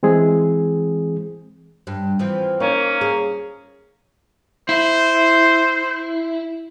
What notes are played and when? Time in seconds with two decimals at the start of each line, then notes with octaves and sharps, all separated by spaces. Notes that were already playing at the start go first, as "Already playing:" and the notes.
0.03 E3 G#3 C4 G#4
1.87 G2
2.19 E3 F3 C4
2.60 A#3 C#4 D#4
3.01 G#4
4.69 E4 C5